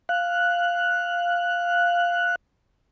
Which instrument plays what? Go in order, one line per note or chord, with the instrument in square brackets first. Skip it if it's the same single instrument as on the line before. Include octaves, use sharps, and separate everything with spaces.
[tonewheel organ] F5 F#6